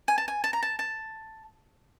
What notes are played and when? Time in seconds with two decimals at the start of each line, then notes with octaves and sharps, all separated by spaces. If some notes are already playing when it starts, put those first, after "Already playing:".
0.08 G#5
0.18 A5
0.28 G#5
0.44 A5
0.53 A#5
0.63 A5
0.79 A5